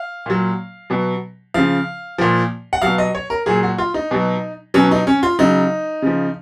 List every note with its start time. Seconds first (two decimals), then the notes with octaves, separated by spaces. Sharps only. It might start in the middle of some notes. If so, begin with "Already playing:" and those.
Already playing: F5
0.26 A#2 F#3
0.90 B2 F#3
1.54 C#3 F3 F5
2.18 A#2 F3
2.73 F#5
2.82 B2 F#3 F5
2.98 D#5
3.15 C#5
3.30 A#4
3.46 A#2 F#3 G#4
3.63 F#4
3.78 F4
3.94 D#4
4.11 B2 F#3
4.74 B2 F#3 C#4
4.91 D#4
5.07 C#4
5.23 F4
5.39 C#3 F#3 D#4
6.02 C#3 F3